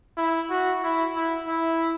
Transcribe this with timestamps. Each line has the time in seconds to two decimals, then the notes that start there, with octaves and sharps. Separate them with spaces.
0.17 E4
0.50 F#4
0.83 E4
1.16 E4
1.48 E4